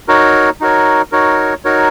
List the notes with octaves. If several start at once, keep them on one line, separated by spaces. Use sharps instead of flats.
D#4 F#4 A#4 C#5
D#4 F#4 A#4 C#5
D#4 F#4 A#4 C#5
D#4 F#4 A#4 C#5